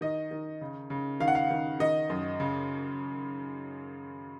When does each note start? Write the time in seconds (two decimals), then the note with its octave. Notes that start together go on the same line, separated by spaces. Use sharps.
0.01 D#3 D#5
0.31 D#3
0.61 C#3
0.90 C#3
1.20 D#3 F5
1.28 F#5
1.35 F5
1.50 D#3
1.80 D#3 D#5
2.10 F#2
2.40 C#3